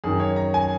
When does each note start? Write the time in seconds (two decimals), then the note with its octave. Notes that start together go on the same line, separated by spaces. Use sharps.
0.04 F#2 D#3 G#4
0.20 C#5
0.36 A#5
0.54 G#5